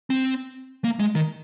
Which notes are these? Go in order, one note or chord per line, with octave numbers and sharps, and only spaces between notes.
C4
A#3
G#3
D#3